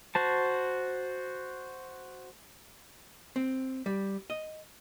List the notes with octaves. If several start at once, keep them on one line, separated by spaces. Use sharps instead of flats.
F#4 C5 A5
C4
G3
D#5